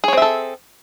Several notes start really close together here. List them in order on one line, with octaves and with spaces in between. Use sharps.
G#4 C#5 C4 E5 A4